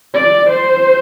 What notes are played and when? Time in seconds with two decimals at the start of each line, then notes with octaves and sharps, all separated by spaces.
0.14 D5
0.49 C5